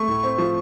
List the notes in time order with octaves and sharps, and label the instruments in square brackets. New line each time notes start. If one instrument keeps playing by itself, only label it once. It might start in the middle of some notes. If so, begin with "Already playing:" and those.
Already playing: [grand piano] A3 [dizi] C#6
[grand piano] A2
C4
F3